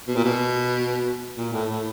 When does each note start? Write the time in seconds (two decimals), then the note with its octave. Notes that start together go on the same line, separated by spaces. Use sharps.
0.08 B2
0.16 A#2
0.24 B2
1.37 A#2
1.52 A2
1.69 A2